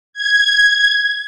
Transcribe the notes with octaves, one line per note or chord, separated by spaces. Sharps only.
G#6